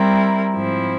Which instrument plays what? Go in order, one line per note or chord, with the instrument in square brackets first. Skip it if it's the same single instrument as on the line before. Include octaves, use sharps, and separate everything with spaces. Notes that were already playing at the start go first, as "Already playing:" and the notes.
Already playing: [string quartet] G3 C4 E4 A#4
G#2 F3 C4 E4